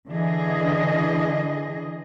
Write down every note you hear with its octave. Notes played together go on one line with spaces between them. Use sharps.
D3 E3 G#4 D#5